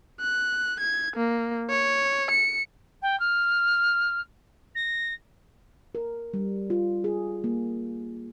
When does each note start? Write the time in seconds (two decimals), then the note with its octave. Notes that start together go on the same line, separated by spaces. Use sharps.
0.21 F#6
0.80 G#6
1.16 A#3
1.70 C#5
2.31 C#7
3.02 G5
3.19 F6
4.75 A#6
5.95 A#4
6.34 G3
6.70 F4
7.04 G#4
7.44 A#3